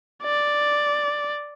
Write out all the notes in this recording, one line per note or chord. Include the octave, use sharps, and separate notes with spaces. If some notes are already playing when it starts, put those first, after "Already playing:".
D5